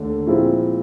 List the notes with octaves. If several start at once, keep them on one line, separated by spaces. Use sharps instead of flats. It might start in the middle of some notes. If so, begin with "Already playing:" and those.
Already playing: D#2 D3 A3 D4
A#2 F3 G#3 C4 E4